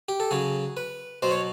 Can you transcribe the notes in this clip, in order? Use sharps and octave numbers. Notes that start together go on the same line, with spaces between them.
G4
A4
C#3 F#3 G#4
B4
B2 F#3 C5
C#5